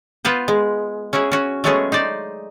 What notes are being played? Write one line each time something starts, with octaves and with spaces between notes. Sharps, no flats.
B3 F4 B4 C5
G#3
C#4 E4 F#4 G#4
C#4 F#4
F#3 G#3 A3 B3 C#4 G#4
D#4 C5 D5